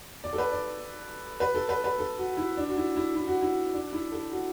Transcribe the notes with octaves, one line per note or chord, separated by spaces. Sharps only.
D5
A4
B4
D5
B4
A4
B4
B4
A4
F#4
E4
D4
F#4
E4
E4
E4
F#4
E4
D4
E4
A4
F#4